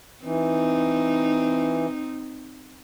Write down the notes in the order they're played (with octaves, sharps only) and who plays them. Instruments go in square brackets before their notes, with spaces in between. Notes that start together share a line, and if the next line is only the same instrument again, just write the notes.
[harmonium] E3 [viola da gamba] C4 D#4